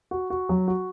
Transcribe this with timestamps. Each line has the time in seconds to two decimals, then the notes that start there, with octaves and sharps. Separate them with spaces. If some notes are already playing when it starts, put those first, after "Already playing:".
0.11 F#4
0.30 F#4
0.49 F#3
0.68 F#4